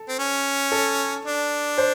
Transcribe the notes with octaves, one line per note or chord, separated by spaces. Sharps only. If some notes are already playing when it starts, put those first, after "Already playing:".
Already playing: A4
C4
C#4
A4
D4
C5